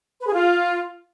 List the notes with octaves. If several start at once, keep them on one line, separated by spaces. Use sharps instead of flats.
B4
G#4
F4